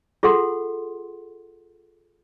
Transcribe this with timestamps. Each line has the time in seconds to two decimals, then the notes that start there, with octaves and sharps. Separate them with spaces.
0.23 F4 G#4 A4 F#5 C6